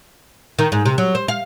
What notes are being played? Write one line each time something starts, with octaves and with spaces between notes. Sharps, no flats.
D#3
G#2
C3
F#3
C5
F5